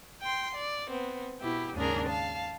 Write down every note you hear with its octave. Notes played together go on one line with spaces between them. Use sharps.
G5 C6
D5
B3 C4
B2 E4 G4
D#2 G#2 C#3 D4 G#4 A#4
F5 A5